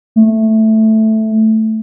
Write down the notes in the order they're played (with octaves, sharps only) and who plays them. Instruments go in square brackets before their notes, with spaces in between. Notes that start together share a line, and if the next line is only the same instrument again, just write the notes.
[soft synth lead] A3